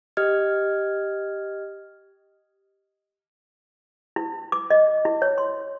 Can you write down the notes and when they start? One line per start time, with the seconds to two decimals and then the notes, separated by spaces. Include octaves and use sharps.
0.17 G4 D#5 F6 G#6
4.16 E4
4.52 D6
4.70 D#5
5.05 E4
5.22 C#5
5.38 C6